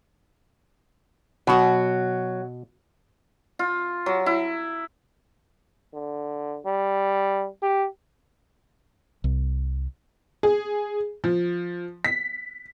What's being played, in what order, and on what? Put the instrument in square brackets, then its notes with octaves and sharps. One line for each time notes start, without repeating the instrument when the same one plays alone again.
[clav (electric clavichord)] B2 [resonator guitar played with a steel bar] F#3 F#4
[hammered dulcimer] F4
F#3
E4
[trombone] D3
G3
G4
[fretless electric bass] C2
[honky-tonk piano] G#4
F3
B6